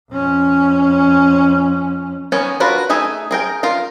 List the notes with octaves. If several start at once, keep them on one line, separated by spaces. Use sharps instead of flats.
F2 C#4
D#3 B3 C#4 C#5
D4 F4 F#4 A#4 B4
A3 D#4 G#4 E5 G#5
G#4 A#4 G5
F4 A#4 F5